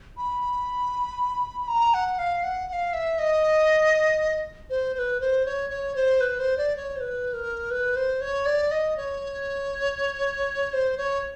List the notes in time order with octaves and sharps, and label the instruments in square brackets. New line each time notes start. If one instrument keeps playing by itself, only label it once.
[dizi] B5
A#5
F#5
F5
F#5
F#5
F5
E5
D#5
C5
C5
B4
C5
C#5
C#5
C5
B4
C5
D5
C#5
C5
B4
A#4
B4
C5
C#5
D5
D#5
C#5
C5
C#5